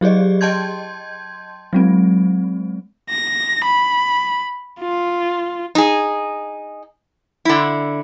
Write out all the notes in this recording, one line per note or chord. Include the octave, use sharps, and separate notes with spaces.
F#3 G4 G#4 D5 D#5
D#5 G5 A5 C6 G6 G#6
F#3 G#3 C4
A#6
B5
F4
D#4 G#4
D3 E4